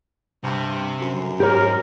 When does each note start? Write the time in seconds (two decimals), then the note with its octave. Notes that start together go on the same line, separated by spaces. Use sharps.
0.44 G2 C3
1.01 F#2
1.40 G#2 G4 A#4 C#5